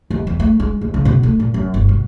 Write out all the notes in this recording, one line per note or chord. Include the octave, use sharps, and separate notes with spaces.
D#2
E2
A3
G#3
D#2
C#3
B2
A3
A#2
F#2
G1
B2